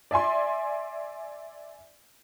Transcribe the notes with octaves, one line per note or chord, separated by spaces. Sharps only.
D5 E5 G#5 C6